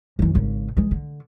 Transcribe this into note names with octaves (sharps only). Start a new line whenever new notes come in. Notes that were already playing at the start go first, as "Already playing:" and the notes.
F#2 E3
G#1 C#3
E3 G#3
D3